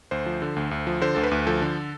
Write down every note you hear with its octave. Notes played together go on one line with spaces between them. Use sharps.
D2 C5
F3
D3
D2
D2
F3
D3 C5
D2 A4
B4
D2
F3 A4
D3